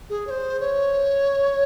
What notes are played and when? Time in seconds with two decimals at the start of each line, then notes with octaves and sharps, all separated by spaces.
0.10 G#4
0.27 C#5
0.30 C5
0.60 C#5